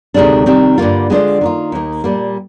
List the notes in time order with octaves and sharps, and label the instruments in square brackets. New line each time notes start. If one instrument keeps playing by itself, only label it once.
[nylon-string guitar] D2 C3 D#3 G#3 D4
C3 D#3 G3 C4
G2 D3 G3 A#3 F4
D3 G#3 D4 F4 C5
D#3 A#3 F4
D#2 D#3 A#3
A#2 G3 A#3